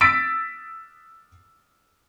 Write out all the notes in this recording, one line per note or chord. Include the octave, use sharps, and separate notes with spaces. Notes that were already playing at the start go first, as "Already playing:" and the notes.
E6 A6 B6 D7